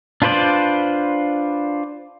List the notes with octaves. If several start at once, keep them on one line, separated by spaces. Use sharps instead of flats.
D4 F4 B4 C5 D5